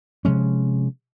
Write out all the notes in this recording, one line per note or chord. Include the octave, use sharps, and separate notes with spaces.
C3 F3 G#3 C#4